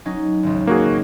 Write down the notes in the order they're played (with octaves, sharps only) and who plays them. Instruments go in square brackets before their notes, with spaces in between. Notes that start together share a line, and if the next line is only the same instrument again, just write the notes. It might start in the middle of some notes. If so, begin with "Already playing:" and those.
[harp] F#3 C#4 D#4
G#1 C#2
[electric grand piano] A#3 F#4 G#4